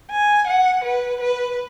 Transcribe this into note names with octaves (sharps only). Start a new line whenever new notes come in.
G#5
F#5
B4
B4